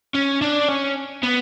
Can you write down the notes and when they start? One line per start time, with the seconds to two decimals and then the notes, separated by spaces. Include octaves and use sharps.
0.15 C#4
0.42 D4
0.69 C#4
1.23 B3